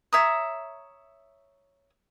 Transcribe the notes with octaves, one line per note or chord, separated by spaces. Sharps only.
C#5 E5 A#5 D#6